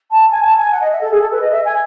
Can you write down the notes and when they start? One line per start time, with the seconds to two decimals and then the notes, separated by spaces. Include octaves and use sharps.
0.10 A5
0.31 G#5
0.44 A5
0.58 G#5
0.71 F#5
0.81 D#5
0.91 E5
1.01 A4
1.11 G#4
1.21 A4
1.31 B4
1.41 D#5
1.51 E5
1.65 G#5